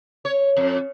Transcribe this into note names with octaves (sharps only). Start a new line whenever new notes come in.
C#5
F2